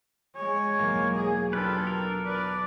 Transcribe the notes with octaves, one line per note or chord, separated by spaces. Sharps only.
G#3 C#5 G#5
E1 F#3 A#3
G#4
D4 F4 G4 A4 B4
A#4
B4 D5